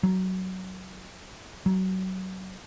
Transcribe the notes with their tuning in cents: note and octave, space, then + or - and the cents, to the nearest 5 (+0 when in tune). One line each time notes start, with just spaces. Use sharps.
F#3 +15
F#3 +25